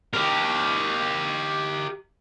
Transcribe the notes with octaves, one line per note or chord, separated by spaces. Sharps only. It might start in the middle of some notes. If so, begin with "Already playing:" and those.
G4 A#4